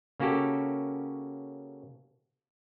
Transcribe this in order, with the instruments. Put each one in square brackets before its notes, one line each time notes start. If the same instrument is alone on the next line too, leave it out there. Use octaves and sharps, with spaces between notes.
[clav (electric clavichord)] C#3 A#3 C#4 F#4 G4 A4